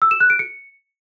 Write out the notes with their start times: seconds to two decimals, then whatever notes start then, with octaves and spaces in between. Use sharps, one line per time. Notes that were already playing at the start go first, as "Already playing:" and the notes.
0.02 E6
0.11 E7
0.20 F#6
0.30 D7
0.39 C#7